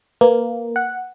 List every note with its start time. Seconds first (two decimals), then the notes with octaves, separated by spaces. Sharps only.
0.21 A#3 B4
0.76 F#5